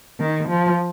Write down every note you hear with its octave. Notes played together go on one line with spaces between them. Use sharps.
D#3
F3